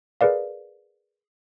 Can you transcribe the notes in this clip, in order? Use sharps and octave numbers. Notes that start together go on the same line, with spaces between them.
G#4 A#4 B4 D5 F5